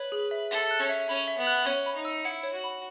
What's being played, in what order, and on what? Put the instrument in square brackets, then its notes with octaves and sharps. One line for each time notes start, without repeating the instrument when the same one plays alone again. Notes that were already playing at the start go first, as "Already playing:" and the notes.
Already playing: [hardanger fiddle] B4 [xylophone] C#5
[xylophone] G#4
E5
[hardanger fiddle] A4 [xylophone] E5
[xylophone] F#6
[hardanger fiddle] C#4
[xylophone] E5
[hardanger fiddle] C#4 [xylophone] B5
[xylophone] E5
[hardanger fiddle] B3
[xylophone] F#6
[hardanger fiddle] C#4 [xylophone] C#5
[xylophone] B5
[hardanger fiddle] D#4
[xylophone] E6
[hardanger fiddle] E4 [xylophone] F#5
[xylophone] C#5
[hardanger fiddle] F#4
[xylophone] B5